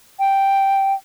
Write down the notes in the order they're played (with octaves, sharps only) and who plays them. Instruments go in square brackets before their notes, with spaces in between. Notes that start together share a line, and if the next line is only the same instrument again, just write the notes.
[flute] G5